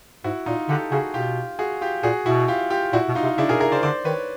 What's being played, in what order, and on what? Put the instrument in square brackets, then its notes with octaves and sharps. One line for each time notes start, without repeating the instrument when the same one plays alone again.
[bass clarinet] G#2 [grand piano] E4 F#4
[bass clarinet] A#2 [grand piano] D#4 F4
[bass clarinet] D3 [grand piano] G4 A4
[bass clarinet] C#3 [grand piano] F#4 G#4
[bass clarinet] B2 [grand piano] F4 G4
[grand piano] F#4 G#4
F4 G4
[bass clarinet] A#2 [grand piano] F#4 G#4
[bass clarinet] B2 [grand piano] E4 F#4
[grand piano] F4 G4
F4 G4
[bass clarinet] A#2 [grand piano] E4 F#4
[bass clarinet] B2
[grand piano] D#4 F4
[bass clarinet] C3
[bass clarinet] C#3 [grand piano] D4 E4
[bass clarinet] B2 [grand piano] G#4 A#4
[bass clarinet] C3 [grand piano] G#4 A#4
[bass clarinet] C#3 [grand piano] C5 D5
[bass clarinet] D3 [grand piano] C5 D5
[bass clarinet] D#3 [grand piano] B4 C#5